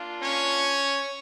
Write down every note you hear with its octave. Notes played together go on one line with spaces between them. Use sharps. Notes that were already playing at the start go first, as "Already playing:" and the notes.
Already playing: A#3 D4 F4
C#4 C#5